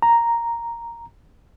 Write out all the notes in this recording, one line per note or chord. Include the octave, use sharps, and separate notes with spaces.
A#5